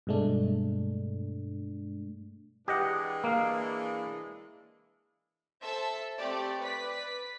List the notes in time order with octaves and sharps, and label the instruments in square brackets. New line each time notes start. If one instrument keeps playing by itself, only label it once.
[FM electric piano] G2 B2 G#3 A3 D4
[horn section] E3 G#3 D4 [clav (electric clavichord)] G4 D#5 F#5
[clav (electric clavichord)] A#3 F5
[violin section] A4 C5 E5 A5 E6
A3 C4 G4 D5
B4 D5 B6